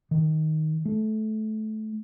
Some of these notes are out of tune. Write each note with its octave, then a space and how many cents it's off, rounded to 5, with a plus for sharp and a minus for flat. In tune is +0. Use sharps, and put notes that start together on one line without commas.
D#3 +5
A3 -20